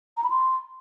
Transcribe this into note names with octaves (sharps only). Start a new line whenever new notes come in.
A#5
B5
C6